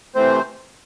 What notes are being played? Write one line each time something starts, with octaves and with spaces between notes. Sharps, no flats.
C3 E3 A3 C4 C5